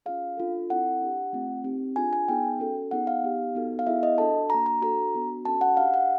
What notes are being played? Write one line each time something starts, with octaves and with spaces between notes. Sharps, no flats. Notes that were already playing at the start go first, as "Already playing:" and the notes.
C#4 F4 G#4 F5
D4 F4 A4
C4 E4 A4 F#5
D4 G4
A3 C4 F4
C4 D#4 G4
D4 F4 G#4 G#5
G#5
B3 D#4 G#4 G5
C#4 F#4 A4
B3 D#4 G#4 F#5
F5
B3 D#4 G4
B3 D#4 F#4 A4
F5
B3 E4 G#4 E5
D#5
D4 F#4 A4 A5
A#3 D4 F#4 A#5
A#5
D4 F#4 A4 A#5
B3 D4 F#4
C#4 F#4 A4 A5
F#5
D4 G4 F5
F#5